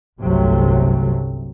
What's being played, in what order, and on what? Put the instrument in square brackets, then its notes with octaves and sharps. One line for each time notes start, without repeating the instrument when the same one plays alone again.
[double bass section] G1 C2 C3 F#3 A3